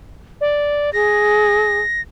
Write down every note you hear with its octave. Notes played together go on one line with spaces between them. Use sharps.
D5
G#4 A#6